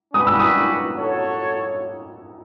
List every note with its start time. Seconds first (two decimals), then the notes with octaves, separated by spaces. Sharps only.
0.14 C#4 F#4 B4 D5 G5 D#6
0.27 E6
0.39 D#6
0.96 F#4 A4 C#5